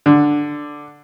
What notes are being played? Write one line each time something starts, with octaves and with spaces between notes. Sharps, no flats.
D3